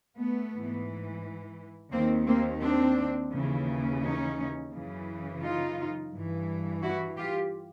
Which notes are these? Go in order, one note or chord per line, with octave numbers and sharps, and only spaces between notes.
A3 B3
G#2 E3
D#2 D#3 A#3 C4
A#3 C4
C4 D4
D#2 C#3 E3
C#4 D#4
F#2 C#3 E3
D#4 F4
G2 E3
E4 F#4
F4 G4